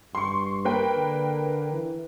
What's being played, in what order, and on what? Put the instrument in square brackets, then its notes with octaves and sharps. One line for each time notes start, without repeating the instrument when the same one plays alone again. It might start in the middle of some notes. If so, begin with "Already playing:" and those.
[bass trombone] G2 [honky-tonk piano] C6 C#6
[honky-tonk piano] A#3 B4 G5
[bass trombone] D3
E3